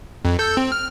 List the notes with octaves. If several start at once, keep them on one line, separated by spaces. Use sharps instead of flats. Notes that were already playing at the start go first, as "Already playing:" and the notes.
F2
A4 E6 G6
C4
F6